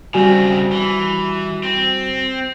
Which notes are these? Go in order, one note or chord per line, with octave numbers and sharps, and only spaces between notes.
C#3 G3 C4 F#4 G#5
E3
C4